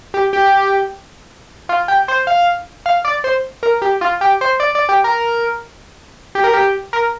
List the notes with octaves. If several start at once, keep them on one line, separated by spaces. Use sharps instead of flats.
G4
G4
F4
G4
C5
F5
F5
D5
C5
A#4
G4
F4
G4
C5
D5
D5
G4
A#4
G4
A#4
G4
A#4